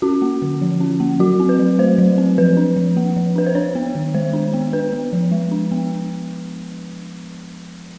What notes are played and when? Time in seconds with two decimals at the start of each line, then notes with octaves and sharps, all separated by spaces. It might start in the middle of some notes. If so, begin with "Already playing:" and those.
0.02 C#4 F#4
0.22 A#3
0.42 D3
0.61 F3
0.80 C#4
1.00 A#3
1.19 F#3 F#4
1.40 C4
1.49 B4
1.59 F#3
1.79 A3 C5
1.98 F#3
2.18 C4
2.38 F3 B4
2.57 D4
2.76 F3
2.97 A#3
3.16 F3
3.36 D4 B4
3.47 C5
3.55 D4 C#5
3.75 B3
3.95 D#3
4.14 G#3 C5
4.33 D4
4.54 B3
4.73 D4 B4
4.93 B3
5.13 F3
5.31 G#3
5.52 D4
5.71 B3